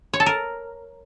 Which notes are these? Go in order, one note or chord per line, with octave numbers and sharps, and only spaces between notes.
C#5
A4
A#4